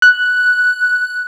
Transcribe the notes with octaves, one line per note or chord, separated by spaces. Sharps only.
F#6